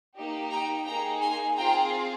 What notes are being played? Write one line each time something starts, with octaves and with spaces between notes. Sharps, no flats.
A#3 D#4 G4
G5 A#5
A#3 D#4 G#4 G5 A#5
G#5 C6
C4 F4 G#4 G5 A#5